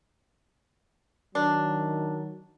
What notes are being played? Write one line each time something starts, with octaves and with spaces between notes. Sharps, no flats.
D#3 F#3 D4